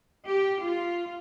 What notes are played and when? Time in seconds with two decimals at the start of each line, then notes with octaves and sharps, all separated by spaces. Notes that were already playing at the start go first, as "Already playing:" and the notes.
0.27 G4
0.62 F4